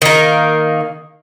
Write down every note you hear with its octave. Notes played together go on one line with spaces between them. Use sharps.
D#3 A#3